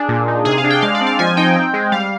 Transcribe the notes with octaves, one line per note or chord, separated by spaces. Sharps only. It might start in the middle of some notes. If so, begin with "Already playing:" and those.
Already playing: D4 G#4
A#2
D#4
C3 G#4
F5
D4
G5
G#3 F5
D5
C4
F5
F3 G#5
D#4 G5
C4
G#3
G3 F5